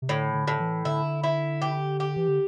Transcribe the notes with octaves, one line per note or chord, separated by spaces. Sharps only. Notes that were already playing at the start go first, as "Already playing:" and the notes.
C3
A2 D3
D3
A2
E3
D3 E4
E4
G4
G4
E3
D3